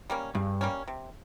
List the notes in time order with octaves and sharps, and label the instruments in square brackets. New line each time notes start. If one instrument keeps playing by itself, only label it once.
[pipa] G3 A#3 C#4
[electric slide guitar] G2 [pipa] C#3
[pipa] G3 A#3 C#4
C3